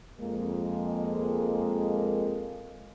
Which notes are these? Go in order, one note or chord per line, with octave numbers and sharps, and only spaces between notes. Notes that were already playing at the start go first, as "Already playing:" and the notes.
F2 G#3 A#3